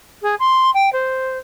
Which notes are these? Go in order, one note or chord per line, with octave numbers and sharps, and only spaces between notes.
G#4
C6
G5
C5